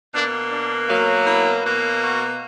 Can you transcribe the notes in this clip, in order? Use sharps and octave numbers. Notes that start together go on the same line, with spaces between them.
B2 A#3 D4
D4
B2 F#3 A#3
E4
B2 A#3
F#4